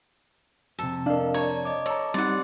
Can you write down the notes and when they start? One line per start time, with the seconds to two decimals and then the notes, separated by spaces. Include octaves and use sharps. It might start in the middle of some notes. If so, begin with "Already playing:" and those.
0.79 F2 C3 A4
1.06 D4 A#4 D#5 F5
1.34 C#5 D5 A5 A#5
1.65 D#5 D6
1.86 A4 C#5 A#5
2.14 G3 C4 D#4 G4 D5 F#5 C6